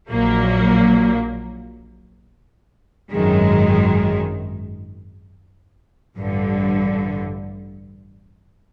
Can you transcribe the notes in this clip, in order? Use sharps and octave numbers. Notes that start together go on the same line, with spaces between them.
A#1 A#2 F#3 A#3
G#1 F#2 D#3 G#3
A1 G2 D3